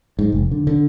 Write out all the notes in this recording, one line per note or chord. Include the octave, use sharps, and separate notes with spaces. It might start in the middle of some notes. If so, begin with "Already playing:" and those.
G#2
F1
D3
D3